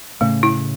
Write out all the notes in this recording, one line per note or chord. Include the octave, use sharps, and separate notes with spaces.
A2 C#3 A3
E4